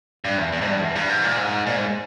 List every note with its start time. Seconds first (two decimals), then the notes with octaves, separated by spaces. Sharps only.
0.25 G2
0.38 E2
0.53 E2
0.61 G#2
0.66 G2
0.81 E2
0.95 G2
1.10 G#2
1.23 A#2
1.37 G#2
1.67 A#2
1.76 G#2